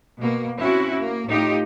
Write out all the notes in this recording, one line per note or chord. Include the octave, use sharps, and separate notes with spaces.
B2 A#3
C4 C#4 E4 F#4
A#3
A2 D#4 F4 G4